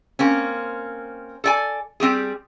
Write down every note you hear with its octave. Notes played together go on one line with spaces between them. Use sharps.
A#3 C4 C#4
A4 D5 G#5
G3 C4 G4 G#4